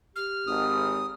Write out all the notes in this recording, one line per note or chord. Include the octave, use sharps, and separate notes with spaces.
G4 F6
G#1 D#6